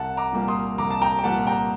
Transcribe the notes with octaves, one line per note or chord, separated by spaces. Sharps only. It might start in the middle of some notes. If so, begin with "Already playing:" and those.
Already playing: C2 F#5 A5
A#5 D6
A#2 G3 A#3
C6 D#6
C2 A#5 D6
A5
G5 A#5
G5
A#2 G3 A#3 F#5 A5
G5 A#5